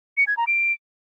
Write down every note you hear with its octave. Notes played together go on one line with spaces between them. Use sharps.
C#7
G#6
A#5
D7